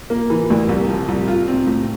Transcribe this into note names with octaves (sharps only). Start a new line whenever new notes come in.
A#3
E3
D2
C2
F3
C2
F4
C4
A2